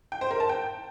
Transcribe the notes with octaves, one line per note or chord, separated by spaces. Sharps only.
G5
C5
A#4
A5
G5